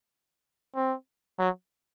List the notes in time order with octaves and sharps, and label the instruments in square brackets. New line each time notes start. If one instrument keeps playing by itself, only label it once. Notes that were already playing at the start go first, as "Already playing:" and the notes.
[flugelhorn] C4
F#3